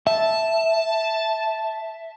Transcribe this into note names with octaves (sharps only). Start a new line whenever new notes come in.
E5 A5